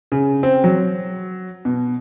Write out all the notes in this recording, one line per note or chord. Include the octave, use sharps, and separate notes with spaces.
C#3
C4
F#3
B2